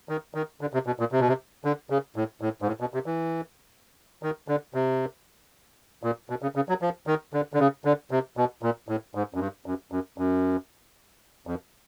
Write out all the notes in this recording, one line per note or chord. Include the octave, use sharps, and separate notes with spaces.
D#3
D#3
D3
C3
B2
A#2
C3
B2
C3
D3
C#3
A2
A2
G#2
A2
B2
C3
E3
D#3
D3
C3
A#2
B2
C#3
C#3
F#3
F3
D#3
D3
D3
C#3
D3
C3
B2
A#2
A2
G#2
F#2
G2
F#2
F#2
F#2
F2